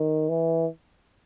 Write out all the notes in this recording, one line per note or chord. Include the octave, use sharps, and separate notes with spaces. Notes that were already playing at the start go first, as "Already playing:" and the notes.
Already playing: D#3
E3